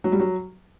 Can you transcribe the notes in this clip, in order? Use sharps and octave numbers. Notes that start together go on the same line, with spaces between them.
F#3
G3
F#3